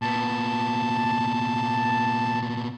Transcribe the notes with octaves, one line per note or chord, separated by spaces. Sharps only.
A#2 B3 A5